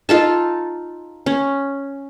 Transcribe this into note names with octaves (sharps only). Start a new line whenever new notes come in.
D#4 F4 A4 A5
C#4